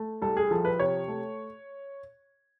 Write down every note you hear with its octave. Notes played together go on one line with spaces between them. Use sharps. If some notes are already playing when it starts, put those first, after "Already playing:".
Already playing: A3
C2 A4
G#4
F3 A4
B4
C3 C#5
A3